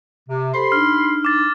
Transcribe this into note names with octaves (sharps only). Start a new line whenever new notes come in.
C3
G4 A4 C5 B5 C6
D4 D#4 F6
D6 A6